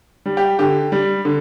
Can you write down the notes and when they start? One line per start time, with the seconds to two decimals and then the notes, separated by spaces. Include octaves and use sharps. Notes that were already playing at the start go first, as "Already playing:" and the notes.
0.26 G3
0.37 G4
0.59 D3 G4
0.92 G3
1.25 D3